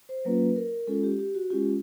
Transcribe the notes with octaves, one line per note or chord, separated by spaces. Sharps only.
C5
F#3 A#3 C#4 F4 B4
A#4
G#3 C#4 F4 A4
G4
G4
F#4
G#3 C#4 F4 G4